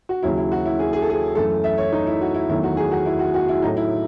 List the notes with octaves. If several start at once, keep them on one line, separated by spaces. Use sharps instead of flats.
F#4
D#2 C#3 F#3 E4
E4
F#4
E4
G#4
G#4
A4
G#4
F#2 E3 A3 A4
E5
C#5
D#4
E4
F#4
E4
E2 D#3 F#3 A3 E4
F#4
G#4
F#4
E4
F#4
F#4
E4
A2 F#3 A3 D#4
E4